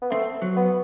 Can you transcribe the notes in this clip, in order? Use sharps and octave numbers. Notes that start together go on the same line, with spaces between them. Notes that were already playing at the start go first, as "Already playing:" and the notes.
B3
A3 C4
F#3
B3